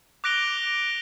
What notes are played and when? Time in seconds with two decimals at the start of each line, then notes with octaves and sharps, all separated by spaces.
0.24 D6 F#6 A#6 D7 F7 G7